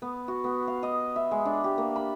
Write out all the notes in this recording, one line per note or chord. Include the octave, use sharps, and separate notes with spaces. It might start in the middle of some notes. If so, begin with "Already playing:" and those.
B3
F#4
B3
F5
D#5
E5
G#3
D4
G4
A#3
B5